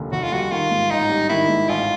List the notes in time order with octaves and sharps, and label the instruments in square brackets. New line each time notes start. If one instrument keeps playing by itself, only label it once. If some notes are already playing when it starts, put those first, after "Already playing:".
Already playing: [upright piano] F1 D#2 D3 G3
[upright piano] F1 [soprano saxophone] F#4
[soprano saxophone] F4
[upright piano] G3 [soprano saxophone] F#4
[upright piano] D#3 [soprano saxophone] F4
[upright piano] G#2
[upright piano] A1 [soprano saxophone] D#4
[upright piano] G3
[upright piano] D#3 [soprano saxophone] E4
[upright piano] G#2
[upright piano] A1 [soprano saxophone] F4